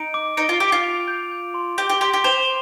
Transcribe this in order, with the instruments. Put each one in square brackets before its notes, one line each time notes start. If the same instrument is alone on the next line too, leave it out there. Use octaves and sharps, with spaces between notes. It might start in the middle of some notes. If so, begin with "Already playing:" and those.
Already playing: [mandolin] D#4 [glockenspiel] D7
[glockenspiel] D6
[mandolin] D#4 [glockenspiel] D7
[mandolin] F4
[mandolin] G4 [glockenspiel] D6
[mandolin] F4
[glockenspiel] F7
G6
G6
C6
[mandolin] G4 [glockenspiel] G6
[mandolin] G4
[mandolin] G4 [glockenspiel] C6
[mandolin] G4
[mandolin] C5 [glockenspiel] F7